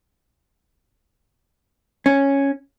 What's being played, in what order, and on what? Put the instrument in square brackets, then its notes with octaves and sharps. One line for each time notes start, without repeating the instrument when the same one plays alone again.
[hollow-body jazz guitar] C#4